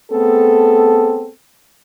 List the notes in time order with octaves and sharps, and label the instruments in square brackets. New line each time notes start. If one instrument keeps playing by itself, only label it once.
[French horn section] A3 B3 C4 G#4 A4